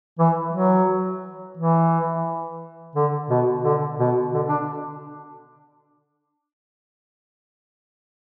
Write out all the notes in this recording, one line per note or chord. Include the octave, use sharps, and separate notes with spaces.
E3
F#3
E3
D3
B2
D3
B2
D3
D4